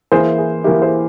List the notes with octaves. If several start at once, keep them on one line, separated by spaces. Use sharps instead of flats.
E3 A#3 E4 G#4 C5
G#4
E3 A#3 E4 G4 A#4
G#4 C5